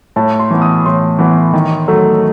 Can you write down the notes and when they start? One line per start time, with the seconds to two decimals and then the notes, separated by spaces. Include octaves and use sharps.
0.16 A2 A5
0.39 C6
0.51 E3 B3
0.62 D#6
0.85 A2 C6
1.19 E3 B3
1.53 D#3
1.88 F#3 A3